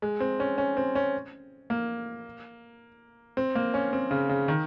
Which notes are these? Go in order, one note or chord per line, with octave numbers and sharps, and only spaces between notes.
G#3
C4
C#4
C#4
C4
C#4
A#3
C4
A#3
C#4
C4
C#3
C#3
D#3